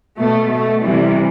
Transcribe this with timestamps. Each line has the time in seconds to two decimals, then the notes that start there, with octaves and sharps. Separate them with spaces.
0.19 B2 A3
0.51 B2 A3
0.83 C3 E3 G3